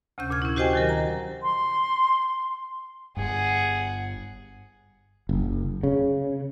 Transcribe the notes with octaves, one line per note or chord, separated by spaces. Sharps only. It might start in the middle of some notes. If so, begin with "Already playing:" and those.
D2 C3 C#4 G6
A#2 F6 G#6
C#4 E4
F#4 G4 C5 D#5 G5 G#5
D#3 F#3 A#4
A#5
C6
G1 G2 G#4 F#5
F#1
C#3